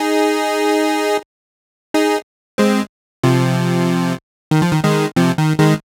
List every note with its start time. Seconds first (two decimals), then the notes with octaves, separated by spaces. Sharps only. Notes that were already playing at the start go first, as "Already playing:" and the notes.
Already playing: D#4 G#4
1.94 D#4 G#4
2.58 G#3 C4
3.23 C3 F3
4.51 D#3
4.62 F3
4.73 D#3
4.83 D#3 G#3
5.16 C3 F3
5.38 D#3
5.59 D#3 G#3